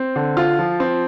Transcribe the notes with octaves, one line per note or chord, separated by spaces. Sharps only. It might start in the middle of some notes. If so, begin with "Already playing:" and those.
Already playing: C4
D3
F4
F3
C4